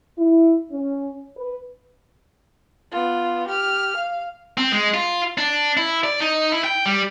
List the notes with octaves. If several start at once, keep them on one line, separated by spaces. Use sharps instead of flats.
E4
C#4
B4
B3 F4
G4 F6
F5
C4
G#3
F4
D4
E4
D5
D#4
E4
G5
G3